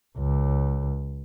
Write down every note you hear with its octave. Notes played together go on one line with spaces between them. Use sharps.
C#2